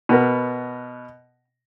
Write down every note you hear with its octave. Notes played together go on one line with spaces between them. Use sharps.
B2 B3 A#4